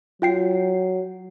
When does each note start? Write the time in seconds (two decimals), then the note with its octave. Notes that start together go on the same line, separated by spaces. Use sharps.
0.22 F#3 F4 G5 C7